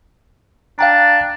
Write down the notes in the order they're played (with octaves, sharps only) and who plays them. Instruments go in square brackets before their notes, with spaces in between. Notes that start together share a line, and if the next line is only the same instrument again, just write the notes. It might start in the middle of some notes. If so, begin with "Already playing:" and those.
[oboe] D4 [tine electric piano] F5 G5 A#5